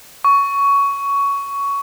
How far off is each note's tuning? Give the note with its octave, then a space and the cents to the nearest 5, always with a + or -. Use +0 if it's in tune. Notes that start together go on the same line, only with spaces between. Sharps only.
C#6 +15